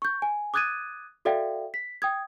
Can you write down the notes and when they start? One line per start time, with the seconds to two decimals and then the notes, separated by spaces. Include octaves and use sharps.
0.02 C#6 G6
0.22 G#5
0.54 D6 D#6 F#6 G#6 A6 D#7
1.25 F#4 A4 D5 E5 F5 G5
1.74 B6
2.02 G5 D#6 G#6